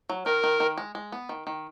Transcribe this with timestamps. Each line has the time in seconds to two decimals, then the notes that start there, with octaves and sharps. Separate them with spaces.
0.09 F#3
0.25 D#3 A#4
0.44 D#3
0.60 D#3
0.78 G#3
0.95 G#3
1.12 B3
1.29 D#3
1.47 D#3